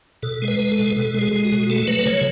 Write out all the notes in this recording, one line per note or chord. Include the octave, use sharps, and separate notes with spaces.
B2 A4
G#3
B4
G#3
A4
B2
B2 A4
G#3
G#4
G#3
F#4
B2
A3 A4
F#3 B4
C#3 C#5